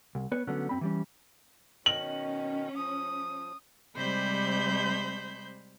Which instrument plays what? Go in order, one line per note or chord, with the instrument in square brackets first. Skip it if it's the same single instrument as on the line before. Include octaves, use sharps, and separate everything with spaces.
[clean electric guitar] C2
B3 B4 C#5
D3 F#3 A3 B3 C#4 D4
F#2 C4 B5
E3 G3 C#4
[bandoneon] B2 D#3 [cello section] C#4 [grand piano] F#7
[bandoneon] F3 [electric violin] D#6
[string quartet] C3 G3 G#3 C5 B5 G6